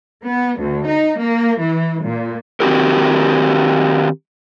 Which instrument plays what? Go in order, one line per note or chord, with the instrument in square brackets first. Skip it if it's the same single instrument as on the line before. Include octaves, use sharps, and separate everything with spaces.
[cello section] B3
D2
D#4
A#3
E3
A#2
[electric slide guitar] D#3 C4 C#4 F#4 G4 A#4